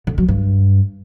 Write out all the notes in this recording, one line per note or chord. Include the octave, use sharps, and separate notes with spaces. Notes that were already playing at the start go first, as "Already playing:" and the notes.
D3
F#3
G2